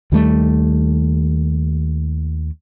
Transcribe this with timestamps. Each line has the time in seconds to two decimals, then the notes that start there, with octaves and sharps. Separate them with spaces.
0.12 D#2 D#3 G3 A3